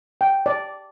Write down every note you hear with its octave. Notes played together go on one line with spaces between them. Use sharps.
G5
D5